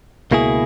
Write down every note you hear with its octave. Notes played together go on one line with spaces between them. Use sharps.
C#2 B2 A#3 E4 G#4